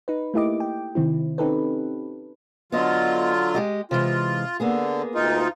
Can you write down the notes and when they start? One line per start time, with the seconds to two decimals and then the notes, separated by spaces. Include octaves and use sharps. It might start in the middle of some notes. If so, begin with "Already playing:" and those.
0.08 D#4 B4
0.34 A3 A#3 E4 G4 D#5 D6
0.60 G5
0.95 C3 D#3 C4 E4
1.38 C4 C#4 D#4 G4 A4 B4
2.72 D3 F#3 B3 F4 D#5
3.54 G#3 G4 D#5
3.91 C3 E3 G#3 F4
4.60 D3 A#3 B3 G#4
5.15 D2 D#4 F4